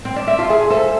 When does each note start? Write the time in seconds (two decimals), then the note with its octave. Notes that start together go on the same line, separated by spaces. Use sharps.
0.05 C4
0.16 D4
0.28 E4
0.39 F4 A5
0.49 G#4 E5 G#5
0.70 A4 C5 E5